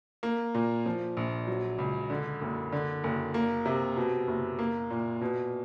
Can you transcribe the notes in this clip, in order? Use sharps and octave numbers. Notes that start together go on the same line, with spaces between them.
A#3
A#2
F3
A#1
F#3
C#2
D3
F#1
D3
F#1
A#3
C3
B2
F#1
A#3
A#2
B2